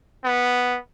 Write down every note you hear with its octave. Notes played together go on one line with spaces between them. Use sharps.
B3